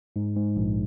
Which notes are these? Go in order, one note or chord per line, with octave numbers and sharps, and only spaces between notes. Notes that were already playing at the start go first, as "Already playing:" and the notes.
G#2
G#2
A#1